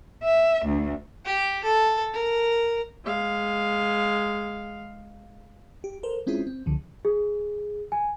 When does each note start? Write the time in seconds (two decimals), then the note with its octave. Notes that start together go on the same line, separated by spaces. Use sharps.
0.23 E5
0.65 D2
1.25 G4
1.64 A4
2.13 A#4
3.05 G#3 F5
5.84 G4
6.03 A4 A#4 C5
6.27 G#3 C4 C#4 E4 F4 G#4
6.47 C4
6.66 C#2 D3 F3
7.05 G#4
7.92 G#5